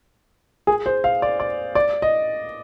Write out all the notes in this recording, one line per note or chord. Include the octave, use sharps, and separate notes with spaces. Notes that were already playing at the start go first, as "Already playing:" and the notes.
G#4
C5
F5
D5
D5
D5
D#5